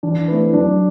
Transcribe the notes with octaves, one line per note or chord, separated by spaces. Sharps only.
E3 D4
A3 C4 E4 B4
F#3 D4